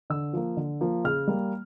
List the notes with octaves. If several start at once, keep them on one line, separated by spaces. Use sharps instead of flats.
D3 E6
F3 A#3
D3
F3 A#3
C#3 F6
G3 A#3